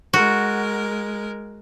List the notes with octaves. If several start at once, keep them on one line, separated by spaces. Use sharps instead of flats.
G#3 F#4 A#4